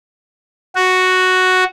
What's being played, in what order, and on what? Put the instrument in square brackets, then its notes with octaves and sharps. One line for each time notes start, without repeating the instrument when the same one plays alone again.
[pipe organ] F#4